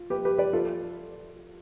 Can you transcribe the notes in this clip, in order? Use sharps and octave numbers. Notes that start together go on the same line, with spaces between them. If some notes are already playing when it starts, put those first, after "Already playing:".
Already playing: F4
G4 B4
G4 B4
B4 D5
F4 A4